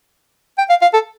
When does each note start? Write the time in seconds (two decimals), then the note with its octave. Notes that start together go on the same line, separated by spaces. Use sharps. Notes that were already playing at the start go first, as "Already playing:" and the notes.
0.58 G5
0.69 F5
0.82 F5
0.94 A4